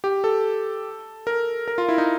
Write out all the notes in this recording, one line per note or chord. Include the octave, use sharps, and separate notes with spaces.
G4
A4
A#4
A#4
F4
E4
D#4